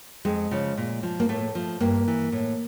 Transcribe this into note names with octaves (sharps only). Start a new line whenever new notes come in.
F2 G#3
C#3 F3
A#2
F3
A#3
A2 A3
F3
G2 A#3
E3
A2